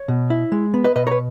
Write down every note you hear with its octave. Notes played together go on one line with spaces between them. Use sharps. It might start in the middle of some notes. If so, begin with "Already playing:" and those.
Already playing: C#5
B2
E4
G#3
B3
B4 D#5
B2 B4 D#5
A#4 B4 C#5